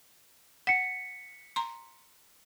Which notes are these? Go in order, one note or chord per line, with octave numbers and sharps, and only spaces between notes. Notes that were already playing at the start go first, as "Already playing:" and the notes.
F#5 B6 C#7
A#5 C6